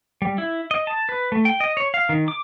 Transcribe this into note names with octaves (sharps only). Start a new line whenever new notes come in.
G3
E4
D#5
A5
B4
A3
G5
D#5
C#5
F5
D#3
D6